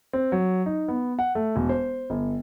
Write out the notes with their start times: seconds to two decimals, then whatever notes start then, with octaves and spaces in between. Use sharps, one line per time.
0.13 C4
0.32 F#3
0.66 D#4
0.88 B3
1.19 F#5
1.35 A3
1.56 E1
1.69 C5
2.10 G1